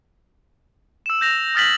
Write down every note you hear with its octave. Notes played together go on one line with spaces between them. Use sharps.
E6 E7
G6 A#6 F7
F7
D#6 F6 A6 B6 F#7